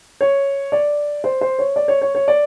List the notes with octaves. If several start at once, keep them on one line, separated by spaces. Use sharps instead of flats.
C#5
D5
C5
C5
C#5
D5
C#5
C#5
C#5
D5